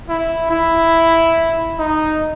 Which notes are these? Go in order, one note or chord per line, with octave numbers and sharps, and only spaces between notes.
E4
E4
D#4